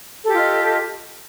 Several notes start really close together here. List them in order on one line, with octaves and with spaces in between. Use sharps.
A4 G4 F4 D#5